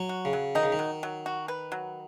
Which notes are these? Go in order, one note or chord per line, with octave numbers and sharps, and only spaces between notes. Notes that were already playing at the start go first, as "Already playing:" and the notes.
Already playing: F#3
F#4
C#3
F#3
D#3 D#4
C#3
D#3
F#3
F#3
F#4
B4
F#3